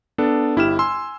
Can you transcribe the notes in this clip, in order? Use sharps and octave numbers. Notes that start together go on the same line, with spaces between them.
B3 D4 A4
G1 E4 G4 F6 E7
G#5 C6 E6